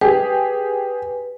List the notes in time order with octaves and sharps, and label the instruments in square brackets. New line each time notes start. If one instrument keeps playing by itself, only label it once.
[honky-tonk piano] G4 G#4 [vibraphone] B4